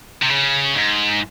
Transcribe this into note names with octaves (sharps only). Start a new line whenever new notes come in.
C3
C#3
G#2